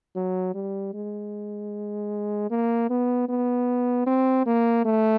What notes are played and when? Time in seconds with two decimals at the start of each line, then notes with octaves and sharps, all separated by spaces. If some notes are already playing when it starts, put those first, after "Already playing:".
0.16 F#3
0.54 G3
0.94 G#3
2.51 A#3
2.90 B3
3.29 B3
4.07 C4
4.46 A#3
4.85 A3